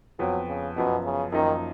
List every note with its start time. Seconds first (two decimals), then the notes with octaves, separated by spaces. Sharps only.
0.19 F2 F3 F#3 B3
0.48 C#3
0.76 F#2 B2 F3 B3
1.04 C#3
1.32 F#2 D#3 F3 A#3 D#4